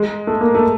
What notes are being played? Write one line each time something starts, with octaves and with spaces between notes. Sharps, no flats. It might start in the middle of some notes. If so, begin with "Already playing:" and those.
Already playing: G#3
A3
A#3
A3